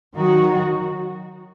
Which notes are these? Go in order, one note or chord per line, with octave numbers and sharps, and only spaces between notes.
D#3 F#3 D#4 F#4